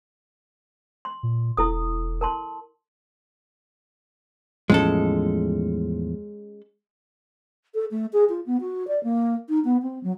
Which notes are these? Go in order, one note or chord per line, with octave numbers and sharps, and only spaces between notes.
C6
A#2
E1 E4 A4 D#6
A#4 A5 C6
E2 A2 F3 G#3 C#4 A4
A4
A3
G#4
F4
B3
F#4
D5
A#3
D#4
B3
C4
F#3